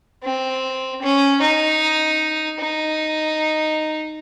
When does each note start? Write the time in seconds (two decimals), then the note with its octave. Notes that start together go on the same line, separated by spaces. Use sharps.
0.23 C4
1.01 C#4
1.41 D#4
2.59 D#4